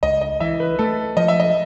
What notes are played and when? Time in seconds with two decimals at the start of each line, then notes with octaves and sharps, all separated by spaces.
0.03 C#2 D#5
0.21 D#5
0.40 E3 E5
0.60 B4
0.79 A3 A4
1.17 F3 D#5
1.28 E5
1.40 D#5